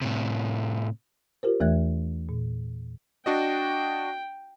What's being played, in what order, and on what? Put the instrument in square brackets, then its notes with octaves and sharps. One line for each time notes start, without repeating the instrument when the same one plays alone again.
[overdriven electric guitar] A2 C3
[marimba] F4 G4 A#4 C5
E2 E3 A3 E5 F#6 G#6
A#2
[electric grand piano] D4 F#4 D#5 [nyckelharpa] G5